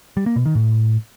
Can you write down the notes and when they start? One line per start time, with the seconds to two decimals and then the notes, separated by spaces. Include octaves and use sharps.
0.17 G3
0.26 A#3
0.36 B2
0.46 D#3
0.55 A2